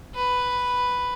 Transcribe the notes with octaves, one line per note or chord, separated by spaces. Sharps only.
B4